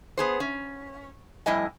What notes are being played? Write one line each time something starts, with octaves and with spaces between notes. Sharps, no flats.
B3 G#4 C5
C#4
F2 A2 G3 E4 D#5 G#5